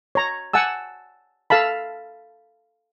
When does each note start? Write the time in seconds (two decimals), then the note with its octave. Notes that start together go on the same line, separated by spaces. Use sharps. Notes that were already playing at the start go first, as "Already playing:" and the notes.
0.15 C#5 A#5
0.53 F#5 G#5 A5 E6
1.50 A4 F5 A5 B5